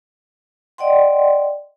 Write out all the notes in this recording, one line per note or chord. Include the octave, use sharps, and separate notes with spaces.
D5 D#5 F#5 G5 C6